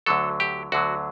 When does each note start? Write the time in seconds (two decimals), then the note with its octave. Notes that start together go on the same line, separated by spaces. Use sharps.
0.06 D2 D3 F#3 A4
0.40 G4
0.72 D2 D3 F#3 F#4